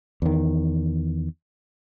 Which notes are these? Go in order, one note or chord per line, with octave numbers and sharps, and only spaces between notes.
E2 D#3